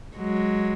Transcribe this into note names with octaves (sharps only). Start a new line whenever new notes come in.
F#3 G#3